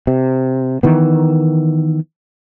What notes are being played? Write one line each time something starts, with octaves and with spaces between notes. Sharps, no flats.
C3
D#3 E3 B3